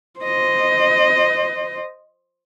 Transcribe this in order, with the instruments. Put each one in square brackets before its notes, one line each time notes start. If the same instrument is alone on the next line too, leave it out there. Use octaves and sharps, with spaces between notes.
[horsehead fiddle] C5 D#5